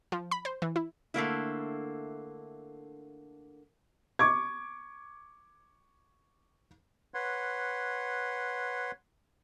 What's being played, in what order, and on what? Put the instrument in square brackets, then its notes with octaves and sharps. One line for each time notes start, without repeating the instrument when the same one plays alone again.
[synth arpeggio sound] F3
B5
C5
E3
E4
[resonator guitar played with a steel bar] D3 A3 A#3 E4
[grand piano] C#6 D6 G#6
[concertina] B4 C#5 F#5 C6